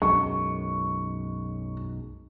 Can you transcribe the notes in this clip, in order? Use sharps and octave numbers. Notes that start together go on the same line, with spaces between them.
B1 F#2 G#3 C#6